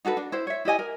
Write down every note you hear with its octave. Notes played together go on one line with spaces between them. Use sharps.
D#4 F#4 A4 B4
D4
E4 C5
C#5 E5
E4 G4 D#5 G#5
A#4